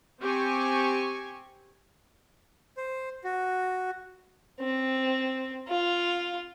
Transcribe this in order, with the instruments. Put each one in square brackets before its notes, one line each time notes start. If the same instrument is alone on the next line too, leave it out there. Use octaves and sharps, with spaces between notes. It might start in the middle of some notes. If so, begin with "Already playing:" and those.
[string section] C4 G4 G#5 C#6
[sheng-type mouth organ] C5
F#4
[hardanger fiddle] C4
F4